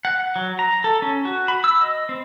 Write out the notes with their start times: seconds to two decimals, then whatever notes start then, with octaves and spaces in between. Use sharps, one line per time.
0.05 F#5
0.36 F#3
0.59 A#5
0.84 A4
1.02 C#4
1.25 F#4
1.48 B5
1.64 E6
1.81 D#5
2.09 C4